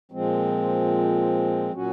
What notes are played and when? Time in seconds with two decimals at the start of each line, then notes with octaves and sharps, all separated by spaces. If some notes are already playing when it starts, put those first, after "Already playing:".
0.12 A#2 F3 G#3 C4
1.73 A#2 F#3 C#4 F#4